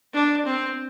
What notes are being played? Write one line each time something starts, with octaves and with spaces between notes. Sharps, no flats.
D4
C4